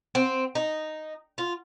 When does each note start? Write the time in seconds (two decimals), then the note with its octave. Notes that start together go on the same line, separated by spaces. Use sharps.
0.15 C4
0.55 D#4
1.38 F4